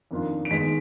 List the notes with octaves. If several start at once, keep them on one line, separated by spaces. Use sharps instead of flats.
F2 D#3 A#3 D4 F4
D7
D#2 D#3 G#3 B3 B6